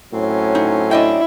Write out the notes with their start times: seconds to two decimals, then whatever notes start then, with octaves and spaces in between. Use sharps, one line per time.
0.13 A2 F#3 C4 C#4
0.55 D#4
0.91 D4 E4 D#5 G5